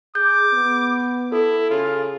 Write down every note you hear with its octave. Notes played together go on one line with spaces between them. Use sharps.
G#4 D6 G6
B3
E4 A4
C#3 F4